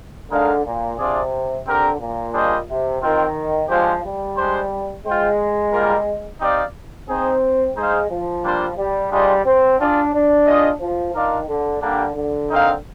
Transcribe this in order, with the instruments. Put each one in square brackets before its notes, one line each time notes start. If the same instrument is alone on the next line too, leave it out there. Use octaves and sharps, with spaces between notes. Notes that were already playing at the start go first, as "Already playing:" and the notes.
[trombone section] D3 [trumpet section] G#3 D#4 A#4 F5
[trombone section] A#2
[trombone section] C3 [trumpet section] D4 F4 G#4 D5
[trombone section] D3 [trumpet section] C4 G4 A#4
[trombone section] A#2
[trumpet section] G3 D4 G#4 C5 D#5
[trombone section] C3
[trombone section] D#3 [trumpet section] C4 F4 A#4
[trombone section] F3 [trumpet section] G#3 D4 G4 C5 F5
[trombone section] G3
[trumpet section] G#3 D4 G4 C5
[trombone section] G#3 [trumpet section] F4 C5 G5
[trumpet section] G3 A#3 F4 A#4
C4 D#4 G4 D5 F5
[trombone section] C4 [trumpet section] D#4 G#4 C5
[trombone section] G#3 [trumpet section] D#4 G#4 C5 F5
[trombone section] F3
[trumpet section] G3 A#3 D4 F4 C5
[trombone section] G3
[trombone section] G3 [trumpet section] D4 F4 G#4 C5 D#5
[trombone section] C4
[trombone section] D4 [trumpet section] F4 G#4 D5
[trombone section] D4
[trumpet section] F4 G#4 D#5
[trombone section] F3
[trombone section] D#3 [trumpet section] D4 F4 A#4 D5 F5
[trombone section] D3
[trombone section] D3 [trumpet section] G3 A#3 D4 G4
[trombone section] D3
[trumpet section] C4 D#4 A#4 F5